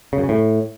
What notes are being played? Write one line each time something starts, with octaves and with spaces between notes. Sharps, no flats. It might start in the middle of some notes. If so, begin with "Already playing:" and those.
C#3
F#2
C#3
A2